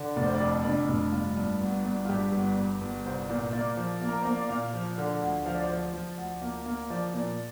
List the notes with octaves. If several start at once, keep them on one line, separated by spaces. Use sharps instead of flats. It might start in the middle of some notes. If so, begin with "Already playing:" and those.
Already playing: D3
F1 D5
C5
D5
F2
F1 D4
F1
G2 F4
G2
G1
G2
F4
G2 G4
G1
G1
G1
C2 C5
A#2
A#3 D5
F3
A#3
A#4
A#3 C5
D5
A#2 F5
F3
D3
D2
F3 F5
D5
C5
F3 D5
F3
D2
A#3
A#3
F3 D5
A#2